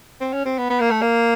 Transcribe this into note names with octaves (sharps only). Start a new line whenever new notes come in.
C4
C#4
C4
B3
B3
A#3
A3
A#3